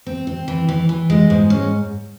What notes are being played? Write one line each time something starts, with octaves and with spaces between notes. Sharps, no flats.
C4
C4
E3
E3
E3
G#3
G#2
C#4